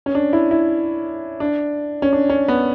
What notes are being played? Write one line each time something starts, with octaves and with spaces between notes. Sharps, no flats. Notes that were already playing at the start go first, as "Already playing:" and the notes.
C#4
D4
E4
E4
D4
C#4
D4
C#4
B3